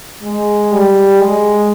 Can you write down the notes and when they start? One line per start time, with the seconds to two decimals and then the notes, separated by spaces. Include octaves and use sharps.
0.23 G#3
0.72 G3
1.20 G#3